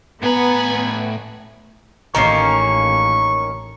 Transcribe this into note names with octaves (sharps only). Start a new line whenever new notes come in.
A2 B3 B4 G#5 A#5
A1 D#3 A#3 C#4 A#5 C#6 C7